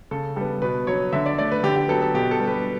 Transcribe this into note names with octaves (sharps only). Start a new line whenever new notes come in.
C#3 A4
G3 B3 A4
B2 B4
F#3 B3 C#5
D3 E5
D5
A3 D5
B4
D3 G4
G4
F#3 B3 A4
A4
B2 G4
A4
G3 B3
B4